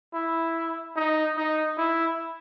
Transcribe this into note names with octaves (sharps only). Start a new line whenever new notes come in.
E4
D#4
D#4
E4